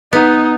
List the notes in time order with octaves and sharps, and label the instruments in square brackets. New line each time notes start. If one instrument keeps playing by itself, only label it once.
[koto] B3 [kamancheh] D#4